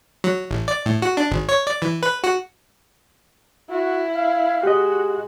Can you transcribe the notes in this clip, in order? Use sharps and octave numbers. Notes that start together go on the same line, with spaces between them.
F#3
A1
D5
A2
F#4
D4
G#1
C#5
D5
E3
B4
F#4
E4 F#4
F5
G#3 F#4 G4 D#5